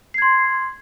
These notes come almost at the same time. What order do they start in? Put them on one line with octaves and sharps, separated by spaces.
C7 G#6 C6